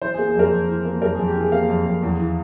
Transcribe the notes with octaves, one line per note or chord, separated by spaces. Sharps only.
E3 C5
G#4
A#3
G#4
F2 A#4
F2
E3
A#3
F2 A#4
F2 G#4
G4
E3 G#4
A#3 F5
F2
F2
E2
E3